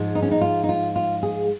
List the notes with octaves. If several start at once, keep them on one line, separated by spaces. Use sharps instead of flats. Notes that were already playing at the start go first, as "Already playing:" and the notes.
Already playing: G#2 F3 G#3
D#4
C#4
D#4
F4
D#4
F4
F4
G#4